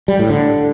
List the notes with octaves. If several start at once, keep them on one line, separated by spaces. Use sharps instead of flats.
G3
A2
D3